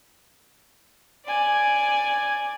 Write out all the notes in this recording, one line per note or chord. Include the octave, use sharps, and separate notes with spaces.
D5 G#5